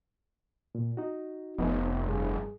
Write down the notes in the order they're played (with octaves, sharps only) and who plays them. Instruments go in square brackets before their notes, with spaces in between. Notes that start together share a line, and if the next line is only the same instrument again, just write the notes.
[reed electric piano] A#2
D#4 F#4
[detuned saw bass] F1 [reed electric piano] B3 D#4
[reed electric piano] G2 G#4